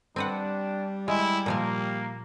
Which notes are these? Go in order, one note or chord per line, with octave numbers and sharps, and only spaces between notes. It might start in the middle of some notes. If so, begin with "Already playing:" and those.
G3 C4 D4 B4 F#5
G#3 E4
A#2 F3 A#3 F5